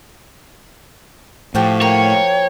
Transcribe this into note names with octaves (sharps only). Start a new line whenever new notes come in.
A2 F3 F#4 G4 G5
A#3 C#5 G5